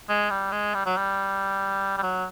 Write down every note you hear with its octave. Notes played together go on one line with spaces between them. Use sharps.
G#3
G3
G#3
G3
F#3
G3
G3
F#3